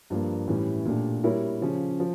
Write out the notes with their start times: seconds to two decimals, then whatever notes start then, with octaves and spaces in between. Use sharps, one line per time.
0.10 G2 F3 A#3
0.48 A2 E3 G3 C#4
0.85 A#2 A3 D4 G4
1.23 G3 A#3 E4 A#4 C#5
1.61 C#3 F3 C#4
2.00 F3